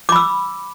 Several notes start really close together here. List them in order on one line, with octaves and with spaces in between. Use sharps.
D6 B5 E6